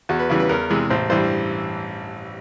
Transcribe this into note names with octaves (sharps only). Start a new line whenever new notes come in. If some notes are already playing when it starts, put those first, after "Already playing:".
E2 F#4
B4
C#3 E3 G3
B4
E2 A#4
C3 E3 G#3
A1 C5
G2 E3 G3 C5